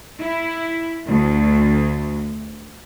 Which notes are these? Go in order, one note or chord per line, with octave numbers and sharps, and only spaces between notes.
E4
D2